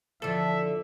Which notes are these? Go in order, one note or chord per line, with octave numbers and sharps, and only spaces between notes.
E2 D3 F3 A4 E5